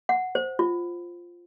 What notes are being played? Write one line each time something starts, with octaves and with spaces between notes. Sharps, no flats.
F#5
C5
F4